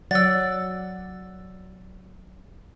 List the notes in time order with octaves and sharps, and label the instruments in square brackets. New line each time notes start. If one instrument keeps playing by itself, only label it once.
[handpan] F#3 D5 F#5 [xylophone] E6 A6